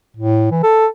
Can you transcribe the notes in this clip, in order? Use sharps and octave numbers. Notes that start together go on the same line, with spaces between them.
A2
E3
A4